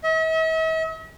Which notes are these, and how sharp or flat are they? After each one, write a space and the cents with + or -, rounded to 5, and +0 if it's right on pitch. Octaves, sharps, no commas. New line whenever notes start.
E5 -45